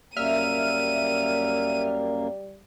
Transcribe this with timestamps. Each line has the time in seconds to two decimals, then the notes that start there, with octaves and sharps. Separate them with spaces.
0.17 F#2 G3 A#3 E5 F6 D#7